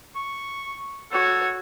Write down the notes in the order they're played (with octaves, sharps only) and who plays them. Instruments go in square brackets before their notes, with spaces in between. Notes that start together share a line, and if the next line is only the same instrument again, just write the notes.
[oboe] C#6
[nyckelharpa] F#4 C#5 [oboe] A4